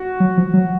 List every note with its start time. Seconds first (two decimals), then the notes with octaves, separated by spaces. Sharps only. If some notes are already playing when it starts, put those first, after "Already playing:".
Already playing: F#4
0.20 F#3
0.37 F3
0.54 F#3